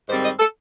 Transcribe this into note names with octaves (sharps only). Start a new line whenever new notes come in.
G#2 D#3 G3 C4 C5
D#5
A4